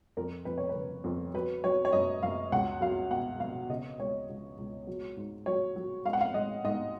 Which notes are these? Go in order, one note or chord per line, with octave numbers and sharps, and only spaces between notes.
F2 A#4
F2 B4
C#5
B4
C#3
F2
F#3 B4
F#3 C#5
C#5
F#2 D#5
F#2 F5
C#2 F#5
F#3 F5
B2 F#5
B2 F5
C#3 D#5
C#2 C#5
C#2
C#2
F#3
G#2
F#3 C#5
F#3
G#3 F5
F#5
F5
G#3 D#5
G#2 D#5